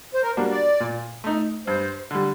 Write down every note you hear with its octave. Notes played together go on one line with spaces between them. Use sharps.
C5
A#4
G3 A#3 D4 F#4
D5
A#2
A3 D#4
G2 C5
D3 G3